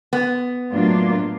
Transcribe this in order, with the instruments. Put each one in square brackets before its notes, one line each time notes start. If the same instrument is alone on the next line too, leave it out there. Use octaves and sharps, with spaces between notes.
[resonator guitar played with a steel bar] B3
[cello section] A2 F#3 A#3 D4 F4